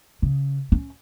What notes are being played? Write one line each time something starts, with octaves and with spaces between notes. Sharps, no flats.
C#3
C#4